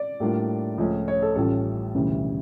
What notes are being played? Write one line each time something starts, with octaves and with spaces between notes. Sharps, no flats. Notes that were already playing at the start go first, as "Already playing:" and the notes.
Already playing: D5
A2 G3 A#3 D4 F4
C#2 C#3 F3 A3 C#4
C#5
A4
A1 A2 G3 C#4 F4 A4
E1 D2 C#3 E3 G3